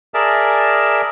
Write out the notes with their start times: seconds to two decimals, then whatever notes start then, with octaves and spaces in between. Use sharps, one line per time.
0.14 G#4 A#4 D5 E5 A5